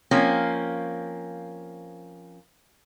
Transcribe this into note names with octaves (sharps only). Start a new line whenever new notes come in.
F3 A#3 C4 C#4